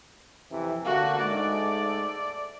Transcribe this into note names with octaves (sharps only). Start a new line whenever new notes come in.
F2 C3 E3
D3 A3 A#3 F#4
G#2 G#3 A3 D5